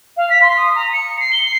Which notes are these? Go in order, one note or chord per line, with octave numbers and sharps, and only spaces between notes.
F5
B6
C6
D#6
A#5
C#7
C7
G7
C7